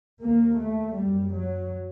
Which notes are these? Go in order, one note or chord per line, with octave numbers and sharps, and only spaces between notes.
D#2 A#3
A3
F#2 G3
F#3